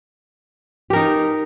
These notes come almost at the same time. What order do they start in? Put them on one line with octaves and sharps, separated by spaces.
G4 A#4 D#4